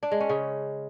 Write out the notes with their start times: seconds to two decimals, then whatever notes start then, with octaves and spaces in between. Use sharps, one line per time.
0.03 D4
0.12 G#3
0.20 C#4
0.29 C#3